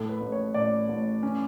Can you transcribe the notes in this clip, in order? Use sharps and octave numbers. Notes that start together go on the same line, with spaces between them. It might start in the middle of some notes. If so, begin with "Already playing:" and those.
Already playing: A2 A4
B4
A1
C#5
A1 D5
A1
C#4